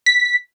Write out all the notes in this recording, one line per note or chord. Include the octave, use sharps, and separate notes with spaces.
B6